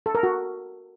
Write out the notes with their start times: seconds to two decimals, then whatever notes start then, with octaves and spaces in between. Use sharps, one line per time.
0.06 A4
0.15 A#4
0.23 F#4